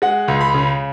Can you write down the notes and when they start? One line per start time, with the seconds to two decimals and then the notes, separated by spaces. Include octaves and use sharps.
0.02 G#3 F#5
0.28 C#2
0.41 B5
0.54 C#3